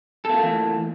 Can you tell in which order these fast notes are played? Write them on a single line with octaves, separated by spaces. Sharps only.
A4 A#3 F4 A3 E3